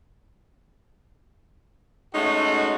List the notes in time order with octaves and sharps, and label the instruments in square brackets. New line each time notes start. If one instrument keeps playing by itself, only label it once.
[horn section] G#3 A3 C#4 D#4 F#4